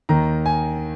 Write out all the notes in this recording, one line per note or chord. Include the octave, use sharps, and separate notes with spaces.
D#2 D#3 A#5
G#5